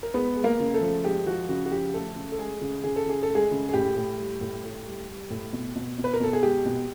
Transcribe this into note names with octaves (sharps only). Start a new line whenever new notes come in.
A#4
G#3 B3 B4
G#3
A#3 A#4
C#3
A3 A4
F3
G#3 G4
F3 F#4
C#3 F#4
F#4
F3 G4
A3 A4
C#3
A4
G#3 A3 G#4
C#3
C#3 G#4
A4
C#3 G#4
A4
A3
G#3 G#4
C#3
G#4
A2 G4
A2
G3
A2
A2
G3
G3
A2
B2
B2
B2
B4
A#4
B2 A4
G#4
G#3 G4
B2